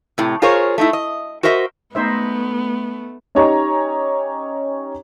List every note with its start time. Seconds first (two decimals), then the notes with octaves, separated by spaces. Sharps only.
0.18 A2 C3
0.42 F4 G#4 A#4 C5 C#5
0.78 A3 D#4 E4
0.93 D#5
1.43 F#4 A#4 C5 D#5 E5
1.95 A3 B3 D#4 C5 E5
3.35 C#4 D#4 G4 C#5 D#5 A#5